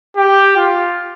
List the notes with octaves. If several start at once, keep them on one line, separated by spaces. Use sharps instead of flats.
G4
F4